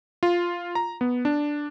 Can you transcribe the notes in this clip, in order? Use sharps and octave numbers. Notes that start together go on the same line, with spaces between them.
F4
A#5
B3
D4